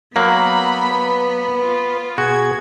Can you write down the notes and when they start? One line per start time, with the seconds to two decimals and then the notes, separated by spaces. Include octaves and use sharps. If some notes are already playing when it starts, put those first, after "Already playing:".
0.16 F#3 A#3 B3 B5 F#6
0.91 B4
1.61 F4
2.18 B2 F#4 G#4 G#6